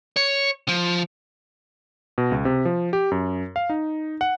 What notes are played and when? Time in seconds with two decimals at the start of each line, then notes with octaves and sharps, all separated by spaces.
0.17 C#5
0.68 F3
2.18 B2
2.32 C#2
2.45 C3
2.65 F3
2.93 G4
3.11 F#2
3.56 F5
3.69 D#4
4.21 F#5